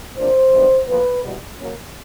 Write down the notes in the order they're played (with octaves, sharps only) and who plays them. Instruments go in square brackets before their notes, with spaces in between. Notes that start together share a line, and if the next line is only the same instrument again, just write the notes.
[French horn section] C3 F3 A#3 D4 C5
G2 D#3 F#3 B3 D4
A2 F3 A#3 B4
E2 B2 G3
C#3 F#3 A#3 C#4